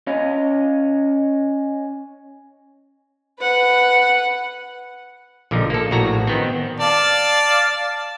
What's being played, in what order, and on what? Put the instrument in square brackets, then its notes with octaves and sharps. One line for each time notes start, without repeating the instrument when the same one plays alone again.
[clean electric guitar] C#4 C#5 D#5 F5
[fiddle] B4 F#5
[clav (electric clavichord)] A#1 D3 F3 D#4
A#3 A4
A#1 A2 F#4 A#5
D#3 B3 C4
[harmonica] D5 F5 A5